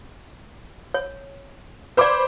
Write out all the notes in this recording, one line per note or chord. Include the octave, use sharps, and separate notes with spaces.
C#5
B4 C5 D5 B5 D6